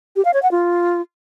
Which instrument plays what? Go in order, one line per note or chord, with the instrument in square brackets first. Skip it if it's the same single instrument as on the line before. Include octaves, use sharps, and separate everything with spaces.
[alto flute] G4
F5
C#5
F#5
F4